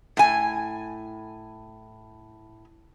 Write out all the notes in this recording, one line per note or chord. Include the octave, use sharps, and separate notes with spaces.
A2 G#5